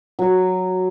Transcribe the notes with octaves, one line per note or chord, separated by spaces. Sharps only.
F#3